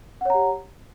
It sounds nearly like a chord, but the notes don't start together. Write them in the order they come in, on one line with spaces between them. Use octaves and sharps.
F#5 C#5 A#5 G4